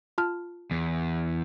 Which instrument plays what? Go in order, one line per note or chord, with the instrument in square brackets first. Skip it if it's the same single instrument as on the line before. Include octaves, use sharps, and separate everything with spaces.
[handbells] F4 A5 F6
[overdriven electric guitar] E2